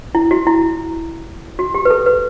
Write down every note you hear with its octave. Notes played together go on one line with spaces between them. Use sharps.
E4
F#4
E4
F#4
G4
B4
A4
B4